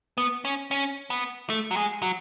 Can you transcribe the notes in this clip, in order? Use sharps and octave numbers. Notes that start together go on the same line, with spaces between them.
B3
C#4
C#4
B3
A3
F#3
G#3
F#3